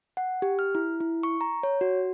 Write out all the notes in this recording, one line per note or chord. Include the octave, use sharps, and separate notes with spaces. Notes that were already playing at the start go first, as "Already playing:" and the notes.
F#5
G4
F6
E4
E4
C#6
A#5
C#5
F#4